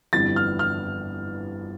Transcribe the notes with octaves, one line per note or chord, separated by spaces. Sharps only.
G1 F2 E3 G3 A6
F6
F6